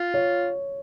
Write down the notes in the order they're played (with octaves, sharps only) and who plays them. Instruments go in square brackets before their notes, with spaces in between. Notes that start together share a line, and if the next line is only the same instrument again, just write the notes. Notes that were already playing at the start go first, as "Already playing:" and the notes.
Already playing: [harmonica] F4
[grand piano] C#5